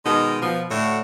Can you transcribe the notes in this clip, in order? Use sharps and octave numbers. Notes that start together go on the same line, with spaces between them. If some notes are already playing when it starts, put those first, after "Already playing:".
B2 D#3 G#3 D#4
B2 F3 B3
A2 D3 F#4